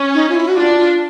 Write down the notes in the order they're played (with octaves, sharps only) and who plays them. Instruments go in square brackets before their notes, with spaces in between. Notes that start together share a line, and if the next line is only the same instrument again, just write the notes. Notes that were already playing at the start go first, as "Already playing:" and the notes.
Already playing: [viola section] C#4
[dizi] D#4
F4
E4
F#4
[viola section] D4 [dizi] F4
[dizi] F4